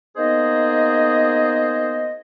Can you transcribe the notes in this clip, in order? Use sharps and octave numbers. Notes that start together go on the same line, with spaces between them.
A#3 B3 D#4 G#4 C5 D#5